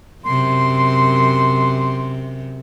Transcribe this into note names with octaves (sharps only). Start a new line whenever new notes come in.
F#2 C3 C6